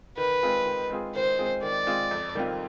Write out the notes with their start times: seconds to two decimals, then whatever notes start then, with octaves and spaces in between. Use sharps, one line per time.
0.17 D#3 B4
0.43 G#3 C4 F4 G#4
0.66 D#3
0.90 G#3 C4 F4 G#4
1.15 D#3 C5
1.38 G#3 C4 F4 G#4
1.63 D#3 D5
1.87 G#3 C4 F4 G#4
2.11 F2
2.35 D#3 G3 C4 F4